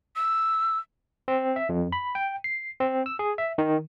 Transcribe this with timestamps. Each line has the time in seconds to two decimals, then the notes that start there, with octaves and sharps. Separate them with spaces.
0.16 E6
1.28 C4
1.56 E5
1.69 F2
1.92 B5
2.15 G5
2.44 C7
2.80 C4
3.06 E6
3.19 G#4
3.38 E5
3.58 D#3